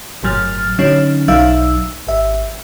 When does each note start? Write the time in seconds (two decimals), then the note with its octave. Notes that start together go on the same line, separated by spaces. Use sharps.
0.23 G1 A2 F#3 F6 A6
0.79 D3 F#3 C#4 D#4
1.28 B1 F#3 D#4 E5 F5 E6
2.07 G#1 E5